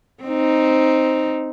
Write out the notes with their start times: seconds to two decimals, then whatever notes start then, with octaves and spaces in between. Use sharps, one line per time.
0.24 C4 D#4